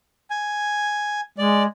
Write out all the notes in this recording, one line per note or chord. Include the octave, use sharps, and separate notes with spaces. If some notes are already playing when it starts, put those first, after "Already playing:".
G#5
G#3 D5